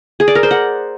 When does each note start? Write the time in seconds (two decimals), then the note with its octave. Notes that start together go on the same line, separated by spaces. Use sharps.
0.20 G#4
0.28 D5
0.35 A#4
0.43 C5
0.51 F#5